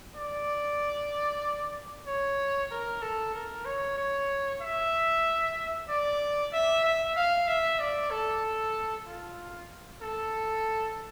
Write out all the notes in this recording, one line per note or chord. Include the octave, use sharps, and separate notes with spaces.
D5
C#5
A#4
A4
A#4
C#5
C#5
E5
D5
E5
E5
F5
E5
D5
A4
F4
A4